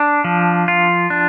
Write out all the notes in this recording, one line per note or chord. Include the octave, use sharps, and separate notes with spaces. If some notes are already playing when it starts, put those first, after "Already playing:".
Already playing: D4
F3
F4
D4